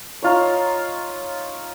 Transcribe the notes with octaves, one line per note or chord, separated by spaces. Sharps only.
D#4 F4 C#5